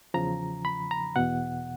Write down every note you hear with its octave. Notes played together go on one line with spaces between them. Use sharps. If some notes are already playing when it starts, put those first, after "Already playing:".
E2 C#3 F3 A#5
B5
A#5
E2 B2 F#5